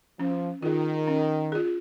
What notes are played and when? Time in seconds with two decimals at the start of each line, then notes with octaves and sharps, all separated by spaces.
0.19 F3 C#4
0.63 D#3 F4 G#4
1.07 C#4
1.52 F4 G#4